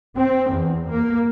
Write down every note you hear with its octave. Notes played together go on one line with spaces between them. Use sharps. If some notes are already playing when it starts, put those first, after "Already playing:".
C4
E2
A#3